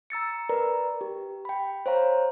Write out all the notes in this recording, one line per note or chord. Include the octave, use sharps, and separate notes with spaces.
A#5 E6 A6 C#7
A#4 B4 D5 A#5
G4
G5 B5
C5 C#5 F5 A#5